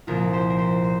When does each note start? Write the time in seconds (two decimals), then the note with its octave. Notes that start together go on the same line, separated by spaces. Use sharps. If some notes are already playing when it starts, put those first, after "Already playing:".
0.07 C2 A#2 F3 F4 A#4
0.33 G4 C5
0.50 A#4
0.58 G4 C5
0.84 G4 C5